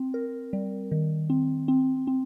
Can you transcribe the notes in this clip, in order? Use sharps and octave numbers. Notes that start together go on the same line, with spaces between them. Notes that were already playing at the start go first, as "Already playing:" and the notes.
Already playing: C4
A#4
G3
D#3
C4
C4
C4